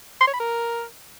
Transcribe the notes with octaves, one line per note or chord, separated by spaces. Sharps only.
C6
C#5
B5
A#4